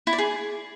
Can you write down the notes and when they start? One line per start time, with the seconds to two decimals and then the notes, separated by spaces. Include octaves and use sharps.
0.07 E4
0.13 D5
0.18 G#4